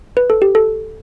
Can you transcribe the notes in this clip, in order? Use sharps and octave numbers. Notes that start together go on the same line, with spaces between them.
B4
A4
G4
A4